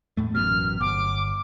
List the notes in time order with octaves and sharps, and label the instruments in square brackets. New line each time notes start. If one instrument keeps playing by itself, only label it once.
[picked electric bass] E2 A2 A3
[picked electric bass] A1 F#2 B2 [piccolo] F6
[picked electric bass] G1 [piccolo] D6